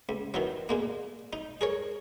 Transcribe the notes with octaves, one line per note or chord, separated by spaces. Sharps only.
C#2
D#3 E3 F#3
A#2 G#3 A#3
D#4
G#4 A#4 C#5